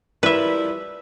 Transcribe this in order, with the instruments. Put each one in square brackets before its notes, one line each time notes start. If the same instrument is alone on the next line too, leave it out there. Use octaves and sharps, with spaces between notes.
[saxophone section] F3 G3 E4 [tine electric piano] A#4 D5 [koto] B4 E5